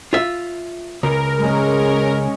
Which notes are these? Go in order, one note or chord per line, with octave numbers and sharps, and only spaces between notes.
F4 E5
C#2 A#4
G#3 C#4